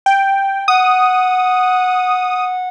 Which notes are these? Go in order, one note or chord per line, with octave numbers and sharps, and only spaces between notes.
G5
F#5 D#6